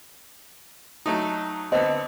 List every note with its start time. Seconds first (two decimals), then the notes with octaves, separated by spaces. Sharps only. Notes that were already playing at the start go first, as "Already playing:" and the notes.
1.06 F#3 A3 D#4
1.72 D3 B3 C4 D#5